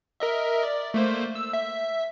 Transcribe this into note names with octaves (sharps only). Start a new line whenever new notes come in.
A#4 D#5 E5
D5
A3 A#3 C5
E6
E5